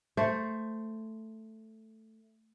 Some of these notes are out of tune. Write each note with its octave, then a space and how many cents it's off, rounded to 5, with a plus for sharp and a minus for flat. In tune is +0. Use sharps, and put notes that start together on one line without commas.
A3 +5 C5 +0